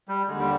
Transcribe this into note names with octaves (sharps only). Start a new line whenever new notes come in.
G3
D#2 D3 G#3
G3